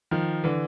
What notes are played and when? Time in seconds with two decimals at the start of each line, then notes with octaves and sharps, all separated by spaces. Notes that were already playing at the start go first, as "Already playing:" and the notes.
0.11 D#3 F3
0.44 D3 E3